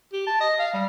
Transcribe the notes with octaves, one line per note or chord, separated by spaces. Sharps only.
G4
A5
D#5
F5
G3